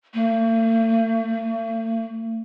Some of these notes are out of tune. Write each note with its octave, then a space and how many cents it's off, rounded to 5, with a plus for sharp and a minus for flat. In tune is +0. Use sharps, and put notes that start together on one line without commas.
A3 +45